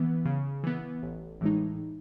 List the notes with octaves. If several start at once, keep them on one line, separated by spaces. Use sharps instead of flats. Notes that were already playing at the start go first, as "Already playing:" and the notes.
Already playing: E3 B3
C#3
E3 B3
A1
A2 E3 G#3 D#4